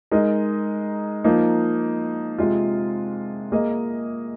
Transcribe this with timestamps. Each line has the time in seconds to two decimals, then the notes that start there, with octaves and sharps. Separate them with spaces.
0.12 G#3 D#4 A#4 D#5
1.24 F3 A#3 D#4
2.38 C3 G#3 F4
3.52 A#3 G#4 D#5